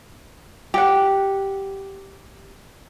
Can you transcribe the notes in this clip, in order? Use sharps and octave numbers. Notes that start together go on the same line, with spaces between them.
G4 F#5